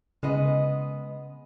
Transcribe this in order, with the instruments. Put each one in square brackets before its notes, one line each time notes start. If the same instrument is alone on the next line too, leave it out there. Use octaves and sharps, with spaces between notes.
[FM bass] C#3 [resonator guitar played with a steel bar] G#3 B3 D#5